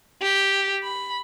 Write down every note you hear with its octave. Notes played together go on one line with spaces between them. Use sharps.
G4
B5